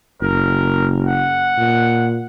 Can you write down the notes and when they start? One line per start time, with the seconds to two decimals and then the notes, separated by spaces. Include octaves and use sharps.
0.22 F#1 A#4
1.07 F#5
1.58 A#2